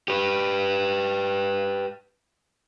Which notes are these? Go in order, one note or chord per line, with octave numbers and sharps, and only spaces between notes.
G4 B4